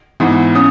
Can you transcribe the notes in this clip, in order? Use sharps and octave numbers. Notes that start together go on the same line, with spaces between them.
G#2 E3 B3
C#4 D#6